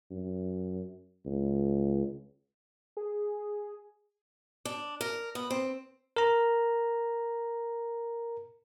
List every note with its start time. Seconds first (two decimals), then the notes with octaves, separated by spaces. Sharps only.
0.11 F#2
1.26 C#2
2.97 G#4
4.65 D4
5.01 A#4
5.35 B3
5.51 C4
6.17 A#4 A#5